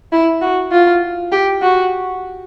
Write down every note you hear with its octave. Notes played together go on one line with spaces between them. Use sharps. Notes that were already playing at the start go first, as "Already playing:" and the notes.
E4
F#4
F4
G4
F#4